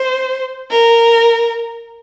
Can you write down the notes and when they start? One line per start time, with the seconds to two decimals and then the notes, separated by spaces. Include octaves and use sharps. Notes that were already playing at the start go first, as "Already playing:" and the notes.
Already playing: C5
0.71 A#4